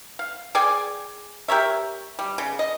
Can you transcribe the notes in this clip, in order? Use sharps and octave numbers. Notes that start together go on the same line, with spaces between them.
F5
G#4 D5 G5 G#5
G4 A#4 C#5 E5
G3
C#3
D#5